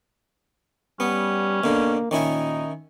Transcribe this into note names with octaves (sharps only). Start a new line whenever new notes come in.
G3 B3 C#4
B2 D3 A#3
A#2 D#3 C#4 D#4 E4